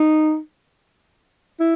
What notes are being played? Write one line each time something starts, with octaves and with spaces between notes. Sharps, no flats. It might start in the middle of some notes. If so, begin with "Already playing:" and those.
Already playing: D#4
E4